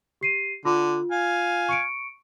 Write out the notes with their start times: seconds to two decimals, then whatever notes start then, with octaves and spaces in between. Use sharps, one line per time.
0.21 G4 C7 D#7
0.65 D3 F4
1.12 F5 G#5
1.69 C#6 C#7 D7